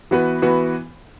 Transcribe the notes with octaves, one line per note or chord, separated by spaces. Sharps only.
E3 B3 F#4 B4
E3 B3 F#4 B4